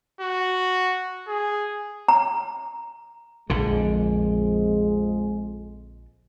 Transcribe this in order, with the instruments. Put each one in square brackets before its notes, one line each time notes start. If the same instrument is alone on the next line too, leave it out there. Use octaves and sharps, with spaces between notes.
[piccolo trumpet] F#4
G#4
[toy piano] A#5
[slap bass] A#1 D3 [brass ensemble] F2 G#3